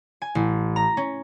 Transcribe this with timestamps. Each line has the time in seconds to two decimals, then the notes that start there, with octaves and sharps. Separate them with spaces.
0.22 G#5
0.35 A1
0.76 A#5
0.97 C#4